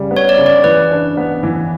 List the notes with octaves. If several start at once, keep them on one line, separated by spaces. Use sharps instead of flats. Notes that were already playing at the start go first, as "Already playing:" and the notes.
Already playing: C#3 G3
B3
C#5
D5
C#3
D5
E3 B4
D4
B3
E3